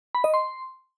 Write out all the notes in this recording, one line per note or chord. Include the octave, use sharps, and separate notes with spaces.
B5
D#5
C6